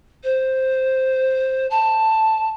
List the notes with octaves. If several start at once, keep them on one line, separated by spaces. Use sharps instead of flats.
C5
A5